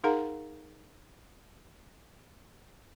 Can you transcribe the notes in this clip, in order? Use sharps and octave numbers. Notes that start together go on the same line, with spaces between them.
D#4 G#4 A#4 F5 F#5 A#5